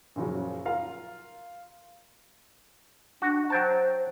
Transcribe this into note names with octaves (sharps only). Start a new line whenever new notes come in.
F#2 A#2 C#3 F3 F#3
F4 A#4 F5 A#5
D4 F#4
F#3 C5 G5 A5